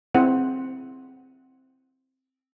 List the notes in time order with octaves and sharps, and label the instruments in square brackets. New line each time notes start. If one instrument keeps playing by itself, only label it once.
[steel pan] C4 E4 G#4 C5 F#5